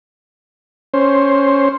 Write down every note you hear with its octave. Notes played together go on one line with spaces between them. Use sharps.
C#4 C5